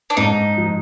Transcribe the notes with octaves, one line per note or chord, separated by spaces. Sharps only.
D4
G#2 D#4
F3